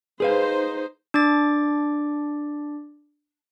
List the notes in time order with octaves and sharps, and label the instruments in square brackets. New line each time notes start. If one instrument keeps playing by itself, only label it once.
[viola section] D#4 C5 [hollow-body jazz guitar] G#4 B4 F5
[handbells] D4 D6 A6